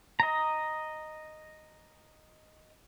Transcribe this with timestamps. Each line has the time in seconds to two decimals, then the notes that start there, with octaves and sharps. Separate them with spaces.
0.20 D#5 A#5